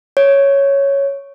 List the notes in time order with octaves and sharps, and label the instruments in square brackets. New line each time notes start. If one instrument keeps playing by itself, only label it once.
[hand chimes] C#5